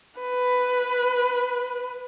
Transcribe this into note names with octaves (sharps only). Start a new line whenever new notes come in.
B4